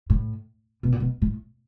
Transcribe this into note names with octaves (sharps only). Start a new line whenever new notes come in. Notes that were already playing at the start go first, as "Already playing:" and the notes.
A2
B2
A#2
B2
A2